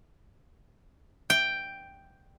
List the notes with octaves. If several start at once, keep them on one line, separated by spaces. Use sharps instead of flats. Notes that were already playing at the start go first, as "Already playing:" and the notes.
G5